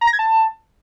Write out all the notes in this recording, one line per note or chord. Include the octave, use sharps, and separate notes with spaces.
A#5
A#6
G#6
A5